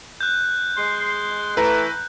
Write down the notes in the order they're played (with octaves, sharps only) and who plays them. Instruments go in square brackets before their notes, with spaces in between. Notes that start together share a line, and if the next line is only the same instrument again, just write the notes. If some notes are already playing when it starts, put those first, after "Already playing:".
[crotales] F#6 G6
[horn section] G#3 C6
[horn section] E3 A3 [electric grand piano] B4 A#5